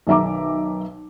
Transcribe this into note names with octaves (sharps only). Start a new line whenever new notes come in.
B1 D#3 E5 A#5 D6